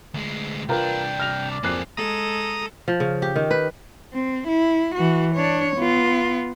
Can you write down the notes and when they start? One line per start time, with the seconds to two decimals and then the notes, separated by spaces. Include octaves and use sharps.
0.14 D2 G#3
0.69 C2 D4 F4 A#4 B4 G5
1.20 F6 A#6 F7
1.51 D5
1.63 F2 A#3 G#4 F#6 C7
1.97 G#3 A4 A#5 D#6
2.88 F3
3.00 C#3
3.22 G4
3.36 D#3
3.51 B4
4.14 C4
4.48 E4
4.95 E3 F#4
5.35 D4 C#5
5.76 B3 F4